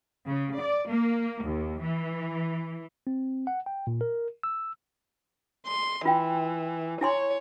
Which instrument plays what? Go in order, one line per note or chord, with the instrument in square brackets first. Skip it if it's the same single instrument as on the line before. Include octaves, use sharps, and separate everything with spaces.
[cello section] C#3
D5
A#3
D#2
E3
[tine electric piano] C4
F#5
G5
A#2
A#4
E6
[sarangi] C6
[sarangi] E3 [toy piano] F4 G5
[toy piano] E4 G#5 C6 [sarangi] C#5